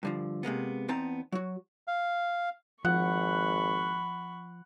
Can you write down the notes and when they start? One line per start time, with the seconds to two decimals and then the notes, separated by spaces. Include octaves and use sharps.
0.03 G2 D3 F3
0.43 C3 G#3 A#3 B3
0.89 E2 B3 C4 D#4 A5 A#5
1.32 F#3 F#4
1.88 F5
2.85 G#1 F3 F#5 B5 C#6